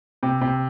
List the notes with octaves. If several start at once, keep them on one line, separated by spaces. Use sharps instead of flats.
C3
C3